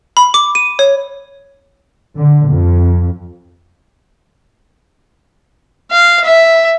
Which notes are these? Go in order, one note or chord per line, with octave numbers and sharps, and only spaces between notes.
B5
D6
D#7
C#5
D3
F2
F5
E5